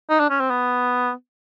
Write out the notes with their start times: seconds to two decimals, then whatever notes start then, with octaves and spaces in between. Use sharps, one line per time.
0.10 D#4
0.19 D4
0.30 C#4
0.40 C4
0.50 B3